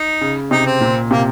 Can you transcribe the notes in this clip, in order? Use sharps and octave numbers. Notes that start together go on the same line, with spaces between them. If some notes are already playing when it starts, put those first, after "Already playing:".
Already playing: D#4
C#3
C3 D#4
C4
A#2
C3 A#3